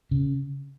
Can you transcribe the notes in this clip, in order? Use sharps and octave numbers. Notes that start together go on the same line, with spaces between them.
C#3